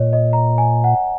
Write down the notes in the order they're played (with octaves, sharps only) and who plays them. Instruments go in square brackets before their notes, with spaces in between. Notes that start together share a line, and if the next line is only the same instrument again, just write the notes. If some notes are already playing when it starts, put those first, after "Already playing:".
Already playing: [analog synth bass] A#2 [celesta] C#5 D#5
[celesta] D#5
A#5
G#5
F#5